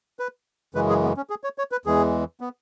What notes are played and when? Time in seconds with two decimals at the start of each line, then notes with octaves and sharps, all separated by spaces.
0.19 B4
0.74 F#2 C#3 E3 G#3 B4
0.89 G#4
1.03 B3
1.17 C#4
1.30 G#4
1.44 C#5
1.58 C#5
1.72 B4
1.85 E2 E3 G#3 G#4
2.41 B3